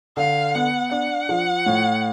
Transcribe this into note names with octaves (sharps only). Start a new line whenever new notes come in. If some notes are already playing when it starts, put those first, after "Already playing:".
D3 F5
B3 F#5
D4 F#5
F3
A2